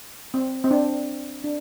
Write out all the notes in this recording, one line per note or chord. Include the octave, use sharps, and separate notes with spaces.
C4
C4
D4
D4